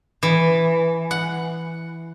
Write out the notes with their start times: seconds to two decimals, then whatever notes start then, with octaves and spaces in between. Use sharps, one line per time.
0.23 E3
1.11 F#5